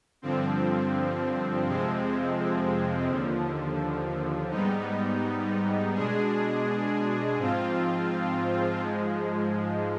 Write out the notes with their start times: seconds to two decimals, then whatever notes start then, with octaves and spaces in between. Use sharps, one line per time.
0.22 G2 D3 F3 C4
1.65 F2 C3 F3 G#3 C4
3.08 D#2 D3 F3
4.51 G#2 G3 B3 D#4
5.94 B2 G#3 D4 G#4
7.37 G#2 F3 C4 F4
8.80 G#2 F3 G#3